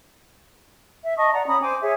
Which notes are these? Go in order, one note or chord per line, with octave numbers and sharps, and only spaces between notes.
E5
D#5 A5 C#6 D#6
D5 F#5 A#5
C#4 A#5 B5 D#6
C5 G5 G#5 D6
G#4 C#5 E5